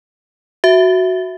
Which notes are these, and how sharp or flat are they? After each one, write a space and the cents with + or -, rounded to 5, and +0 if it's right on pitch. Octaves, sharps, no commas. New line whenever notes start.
F#4 +0 E5 +0